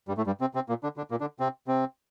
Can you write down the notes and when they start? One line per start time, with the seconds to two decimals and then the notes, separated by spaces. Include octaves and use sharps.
0.08 G2 G3
0.17 A2 A3
0.27 G2 G3
0.40 C3 C4
0.54 C3 C4
0.68 A#2 A#3
0.83 D3 D4
0.97 D3 D4
1.11 A#2 A#3
1.21 D3 D4
1.40 C3 C4
1.67 C3 C4